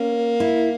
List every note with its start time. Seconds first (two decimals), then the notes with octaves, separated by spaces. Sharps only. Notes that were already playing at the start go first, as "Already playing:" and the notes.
Already playing: A#3 C#4
0.40 E4